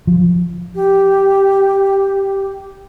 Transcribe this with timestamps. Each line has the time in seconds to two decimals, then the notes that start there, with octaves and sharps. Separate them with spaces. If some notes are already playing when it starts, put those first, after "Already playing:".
0.07 F3
0.75 G4